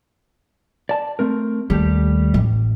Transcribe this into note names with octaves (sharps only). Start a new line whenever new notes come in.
D5 A5
A3 C4 A#4
D#2 G3 A3 G4
A1